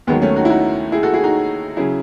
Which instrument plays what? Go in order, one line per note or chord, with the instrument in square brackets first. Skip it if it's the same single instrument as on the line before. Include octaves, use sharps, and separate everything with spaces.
[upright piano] D#2 D#3 F#3 G#3 B3
A3 C#4
D#4 F#4
E4
D#4 F#4
E4 G#4
F#4 A4
E4 G#4
D#4 F#4
C#3 F#3 E4 G#4